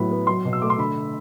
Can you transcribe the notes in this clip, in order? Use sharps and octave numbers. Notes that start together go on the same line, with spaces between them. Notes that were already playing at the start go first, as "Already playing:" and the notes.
Already playing: A2 F#3 B3 B5
B3
F#3 C6
B2
E6
A3 D6
C6
D3 B5